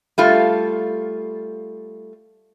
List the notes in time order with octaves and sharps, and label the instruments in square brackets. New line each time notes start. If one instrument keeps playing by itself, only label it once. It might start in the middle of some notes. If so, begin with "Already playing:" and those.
[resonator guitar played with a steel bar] G3 A3 F4